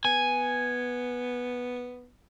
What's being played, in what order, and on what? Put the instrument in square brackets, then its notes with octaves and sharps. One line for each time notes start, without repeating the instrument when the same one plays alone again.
[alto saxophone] B3 [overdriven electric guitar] G#5